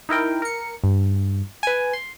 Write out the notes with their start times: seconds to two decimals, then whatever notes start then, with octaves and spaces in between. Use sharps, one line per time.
0.09 D#4 E4 A#4 G5
0.42 A#4 C#7
0.84 G2
1.63 B4 G#5
1.93 C6